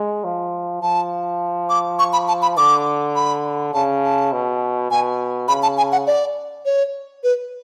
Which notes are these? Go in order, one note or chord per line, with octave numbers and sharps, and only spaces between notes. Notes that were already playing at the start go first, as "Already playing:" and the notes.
Already playing: G#3
F3
F3 A5
D6
C#6
B5
A5
B5
D3 D6
B5
C#3 A5
A5
B2
B2 G#5
C#3 B5
A5
G#5
F#5
D5
C#5
B4